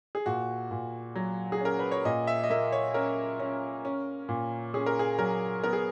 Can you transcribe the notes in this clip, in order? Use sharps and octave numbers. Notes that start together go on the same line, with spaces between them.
G#4
A#2 F#4
A#2
F#3
G#4
C#4 A#4
B4
C#5
A#2 D#5
E5
D#5
A#3 E5
C#5
C#4 A#4
C#4
C#4
A#2
C#4 G#4
A#4
G#4
F#3 A#4
B3 A#4
G#4